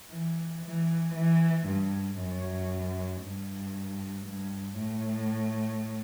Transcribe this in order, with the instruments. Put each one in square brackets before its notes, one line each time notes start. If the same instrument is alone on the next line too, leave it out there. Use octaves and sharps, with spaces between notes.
[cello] E3
E3
E3
G2
F#2
G2
G2
A2